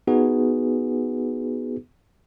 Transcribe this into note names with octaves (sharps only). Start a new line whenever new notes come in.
B3 D#4 F#4 G#4 B4